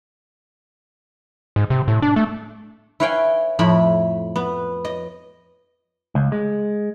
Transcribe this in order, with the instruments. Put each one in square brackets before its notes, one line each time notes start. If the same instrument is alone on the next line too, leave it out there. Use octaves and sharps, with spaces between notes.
[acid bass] G#2
C3
A2
D4
A3
[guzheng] E4 B4 C#5 F5 G5 G#5
F2 A2 E4 B5
B3
D#5
[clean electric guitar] C#2
G#3